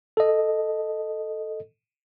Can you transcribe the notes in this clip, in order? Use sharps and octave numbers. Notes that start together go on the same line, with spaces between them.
A4 D#5